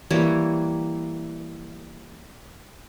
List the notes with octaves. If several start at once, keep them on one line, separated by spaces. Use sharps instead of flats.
E3 G3 A#3 C#5